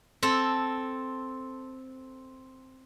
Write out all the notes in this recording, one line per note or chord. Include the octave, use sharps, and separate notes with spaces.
C4 A4